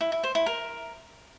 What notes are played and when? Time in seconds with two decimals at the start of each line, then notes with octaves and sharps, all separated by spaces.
0.01 E4
0.12 E4
0.23 C5
0.35 E4
0.46 A#4